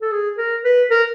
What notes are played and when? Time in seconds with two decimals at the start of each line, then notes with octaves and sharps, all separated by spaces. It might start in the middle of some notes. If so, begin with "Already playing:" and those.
0.02 A4
0.11 G#4
0.38 A#4
0.64 B4
0.90 A#4